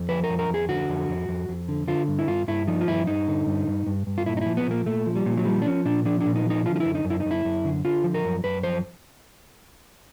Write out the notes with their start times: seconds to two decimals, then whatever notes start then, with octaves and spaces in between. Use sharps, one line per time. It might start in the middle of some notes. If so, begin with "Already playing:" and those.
Already playing: F2
0.09 F3 B4
0.24 A#4
0.29 F2
0.39 A#4
0.49 F2
0.54 G#4
0.69 D3 F#4
0.89 F2
1.09 F2
1.29 F2
1.49 F2
1.68 D3
1.88 D3 F4
2.08 G2
2.19 E4
2.28 G2 F4
2.48 G2 E4
2.67 F3 D#4
2.81 F4
2.88 G2 E4
3.07 G2 D#4
3.28 D3
3.47 G2
3.68 G2
3.87 G2
4.07 G2
4.18 F4
4.26 A#2 E4
4.37 D#4
4.41 F3 E4
4.57 B3
4.67 A#2 A#3
4.86 A#2 A3
5.06 F3
5.16 G3
5.26 A#2
5.38 F#3
5.45 F3 G3
5.62 D4
5.66 F3 C#4
5.85 A#2 D4
6.05 F3 D4
6.21 D4
6.26 A#2
6.36 D#4
6.46 F3 D#4
6.65 D3 F4
6.76 F4
6.80 F#2 E4
6.95 D#4
7.05 F#2
7.10 E4
7.20 D#4
7.26 F#2
7.31 E4
7.45 F#2
7.65 D3
7.85 D3 F4
8.04 F3
8.14 A#4
8.24 F#2
8.44 F#2 B4
8.63 F3 C5